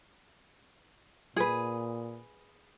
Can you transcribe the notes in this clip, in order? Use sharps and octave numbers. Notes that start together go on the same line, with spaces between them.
A#2 G#4 B4